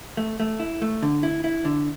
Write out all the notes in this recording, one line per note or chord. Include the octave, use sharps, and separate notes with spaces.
A3
A3
E4
A3
D3
E4
E4
D3